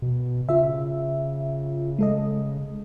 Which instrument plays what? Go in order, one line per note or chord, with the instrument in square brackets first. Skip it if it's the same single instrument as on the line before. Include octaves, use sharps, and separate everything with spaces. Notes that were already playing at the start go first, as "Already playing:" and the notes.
[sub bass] B2
[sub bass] C#3 [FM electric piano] F4 E5
[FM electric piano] G#3 A4 D#5